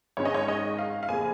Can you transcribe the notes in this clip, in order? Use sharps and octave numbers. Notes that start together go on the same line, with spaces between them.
G#1 G#2 D#3 C#4 C#5
D#5
C#5
D#5
F5
F5
F1 F2 C#3 A#3 G#5